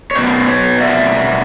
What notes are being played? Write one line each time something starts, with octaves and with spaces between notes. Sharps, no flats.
C#5
B2 F#3 B3 C5 D5
B4 C#5
D5 E5